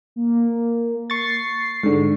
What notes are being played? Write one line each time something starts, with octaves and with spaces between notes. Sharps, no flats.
A#3
C#6 A6 C7
G#2 D3